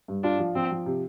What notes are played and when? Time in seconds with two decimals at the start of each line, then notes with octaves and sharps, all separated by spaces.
0.08 G2
0.23 D4 F4
0.39 F3
0.55 F3 C4
0.72 F3
0.86 C3